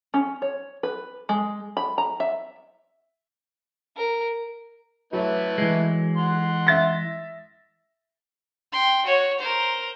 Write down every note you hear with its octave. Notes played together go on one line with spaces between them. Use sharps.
C#4
C#5
B4
G#3
B5
A#5
E5
A#4
F#3 A3 E4 B4
E3 G#3
F#5 C6
E5 A6 A#6
G5 C6
F#4 C#5
A#4 C5